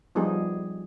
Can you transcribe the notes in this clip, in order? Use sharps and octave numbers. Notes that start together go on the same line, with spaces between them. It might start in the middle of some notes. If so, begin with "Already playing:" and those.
F3 G3 B3 D#4 G#4